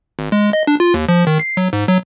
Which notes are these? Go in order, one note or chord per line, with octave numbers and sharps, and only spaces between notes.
G#1
G#3
D#5
D4
F4
D#2
F3
D#3
C7
F#3
G#2
F#3